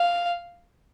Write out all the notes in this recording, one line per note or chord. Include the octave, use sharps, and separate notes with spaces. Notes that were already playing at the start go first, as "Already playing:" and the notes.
Already playing: F5